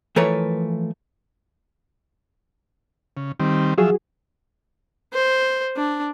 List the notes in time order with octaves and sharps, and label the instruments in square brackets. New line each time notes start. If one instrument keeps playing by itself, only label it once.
[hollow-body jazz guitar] E3 F3 A3 A#4 B4 C#5
[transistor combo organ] C#3
D#3 G3 C4
[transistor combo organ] F3 E5 [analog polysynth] F#3 F#4 G#4
[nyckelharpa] C5
D4